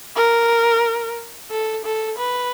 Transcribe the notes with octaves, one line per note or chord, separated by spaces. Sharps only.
A#4
A4
A4
B4